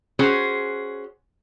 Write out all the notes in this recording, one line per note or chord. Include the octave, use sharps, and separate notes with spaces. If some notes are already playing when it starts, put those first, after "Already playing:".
C#4 F#4 G#4 C5